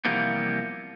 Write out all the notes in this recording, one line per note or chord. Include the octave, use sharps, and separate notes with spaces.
C3 E3 F3 G3 A#3 B3